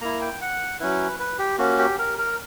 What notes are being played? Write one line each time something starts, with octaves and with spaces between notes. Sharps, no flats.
A#3 E4 A#5
G5
F#5
F#3 C#4 E4 B4
B4
G4
A#3 C#4 F#4
G4
A#4
A#4